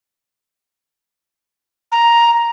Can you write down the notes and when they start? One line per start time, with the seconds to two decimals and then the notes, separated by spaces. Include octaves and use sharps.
1.92 A#5